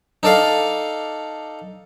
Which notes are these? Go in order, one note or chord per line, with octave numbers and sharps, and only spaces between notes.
D#4 A4 D5 F5